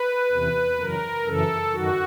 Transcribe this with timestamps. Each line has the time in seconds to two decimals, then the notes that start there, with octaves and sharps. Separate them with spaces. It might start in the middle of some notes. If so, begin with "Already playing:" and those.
Already playing: B4
0.32 E2 C3 E3
0.78 F#2 C#3 E3 A#4
1.26 F#2 C#3 E3 A4
1.73 F#2 D#3 F#4